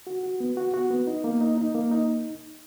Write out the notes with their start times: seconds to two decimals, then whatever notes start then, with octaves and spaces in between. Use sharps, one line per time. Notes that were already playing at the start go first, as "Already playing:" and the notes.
0.07 F#4
0.23 F#4
0.40 B3
0.57 F#4
0.74 F#4
0.90 B3
1.07 D#4
1.24 A#3
1.41 D#4
1.58 D#4
1.75 A#3
1.91 D#4